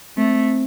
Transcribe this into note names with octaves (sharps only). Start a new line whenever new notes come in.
A3 C4